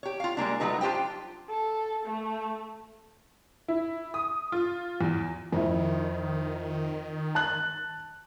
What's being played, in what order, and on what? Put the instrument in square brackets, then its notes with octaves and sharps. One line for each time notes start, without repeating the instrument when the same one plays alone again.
[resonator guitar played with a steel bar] G4 C#5
F4 F5
G3 G#3 A#3 D4
F#3 G3 A3 D#4 B4
D4 F4 G4 C5 G5
[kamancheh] A4
A3
[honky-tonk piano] E4
D#6
F4
E2
[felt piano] F2 E4 [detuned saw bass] D#3
[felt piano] A5 F#6